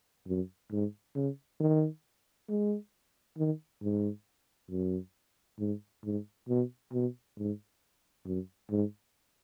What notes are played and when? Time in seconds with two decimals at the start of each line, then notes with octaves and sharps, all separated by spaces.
0.27 F#2
0.71 G#2
1.15 C#3
1.60 D#3
2.49 G#3
3.37 D#3
3.82 G#2
4.70 F#2
5.59 G#2
6.04 G#2
6.49 B2
6.92 B2
7.38 G#2
8.25 F#2
8.70 G#2